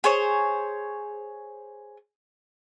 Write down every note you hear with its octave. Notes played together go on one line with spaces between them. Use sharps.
G#4 C5 C#5